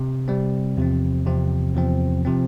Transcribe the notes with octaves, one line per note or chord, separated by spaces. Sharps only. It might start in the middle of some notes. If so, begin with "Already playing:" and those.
Already playing: C3
C3 G3 C4
E2 C3 F3 C4
E2 C3 F3 C4
E2 C3 F3 C4
C3 F3 C4